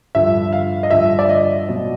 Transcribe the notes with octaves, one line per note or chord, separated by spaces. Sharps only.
G2 D3 F3 E5
F5
D#5
G2 D3 F3 E5
D5
D#5
B2 F#3